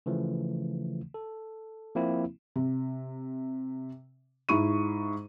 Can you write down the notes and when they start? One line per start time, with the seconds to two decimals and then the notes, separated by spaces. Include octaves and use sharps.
0.06 C#3 E3 F3 A3
1.14 A4
1.95 F3 A#3 C4 E4
2.56 C3
4.49 G#2 E4 C#6 D#7